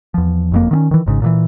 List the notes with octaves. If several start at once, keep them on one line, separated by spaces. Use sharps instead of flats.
E2 F3
F#1 F2 A#3
D#3 B3 C#4
D#3 E3
G#1 G#2 C#3
A#2 D3 E3